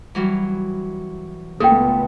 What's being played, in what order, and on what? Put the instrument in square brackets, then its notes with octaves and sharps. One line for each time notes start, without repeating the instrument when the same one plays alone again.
[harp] E3 F#3 G3
[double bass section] C#2 A3 B3 [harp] A#2 [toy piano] A4 G5